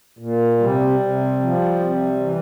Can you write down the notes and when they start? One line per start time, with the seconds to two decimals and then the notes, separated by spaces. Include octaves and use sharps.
0.19 A#2
0.59 C3 G3
0.99 C3
1.40 F3
1.80 C3
2.20 E3